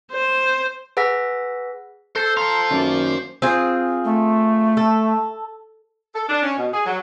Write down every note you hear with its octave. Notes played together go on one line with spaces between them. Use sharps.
C5
G#4 B4 F#5 E6 A#6 B6
A4 C5
C5 F5 A#5 C6
F#2 D#3 A#3 D5
C4 F4 G#4
A3
A4
A4
D4
C#4
B2
G#4
F#3